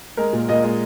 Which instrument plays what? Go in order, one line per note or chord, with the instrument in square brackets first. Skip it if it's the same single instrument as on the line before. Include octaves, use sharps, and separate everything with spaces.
[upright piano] G#3 A#4
A#2
A#2 D#5
G#3